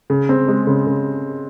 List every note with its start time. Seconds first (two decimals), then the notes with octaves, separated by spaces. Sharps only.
0.10 C#3
0.29 C4
0.48 G#3
0.67 C#3
0.87 C#3